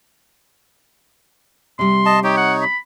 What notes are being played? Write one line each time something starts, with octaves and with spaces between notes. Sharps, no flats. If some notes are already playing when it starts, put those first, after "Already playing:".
C3 G3 C6
D#5 A5
D#4 G4 C#5
F#5
B5